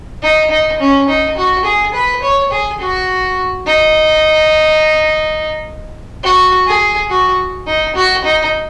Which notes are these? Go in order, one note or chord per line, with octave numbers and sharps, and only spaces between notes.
D#4
D#4
C#4
D#4
F#4
G#4
B4
C#5
G#4
F#4
D#4
F#4
G#4
F#4
D#4
F#4
D#4